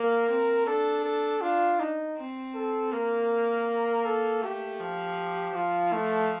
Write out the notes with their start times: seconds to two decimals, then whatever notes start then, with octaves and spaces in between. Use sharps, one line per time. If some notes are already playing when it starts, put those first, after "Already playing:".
Already playing: A#3 A#4
0.29 C4
0.66 D4 A4
1.04 A4
1.41 D4 F4
1.79 D#4
2.17 C4
2.55 A4
2.92 A#3 A#4
4.05 A4
4.42 A3 G4
4.80 F3
5.55 F3 F4
5.93 A3